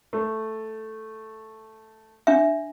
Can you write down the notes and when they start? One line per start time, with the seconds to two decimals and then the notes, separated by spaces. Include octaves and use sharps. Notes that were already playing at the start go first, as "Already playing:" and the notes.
0.13 A3
2.27 D4 E5